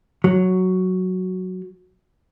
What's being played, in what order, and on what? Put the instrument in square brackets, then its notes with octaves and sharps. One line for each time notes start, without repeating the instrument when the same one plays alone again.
[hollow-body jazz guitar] F#3